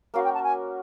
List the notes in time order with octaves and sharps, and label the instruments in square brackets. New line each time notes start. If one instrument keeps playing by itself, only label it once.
[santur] A#3 C#4 F#4 A#4 [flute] F5
[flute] G5
A5
G#5